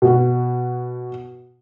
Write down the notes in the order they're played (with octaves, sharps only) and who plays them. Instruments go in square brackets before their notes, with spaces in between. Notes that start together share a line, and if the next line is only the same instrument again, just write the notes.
[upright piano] B2 F#4